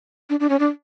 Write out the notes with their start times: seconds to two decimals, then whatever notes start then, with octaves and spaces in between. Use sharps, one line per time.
0.30 D4
0.40 D4
0.50 C#4
0.60 D4